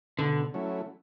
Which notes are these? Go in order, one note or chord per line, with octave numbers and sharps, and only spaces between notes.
B2 D3
F#3 A3 C#4 E4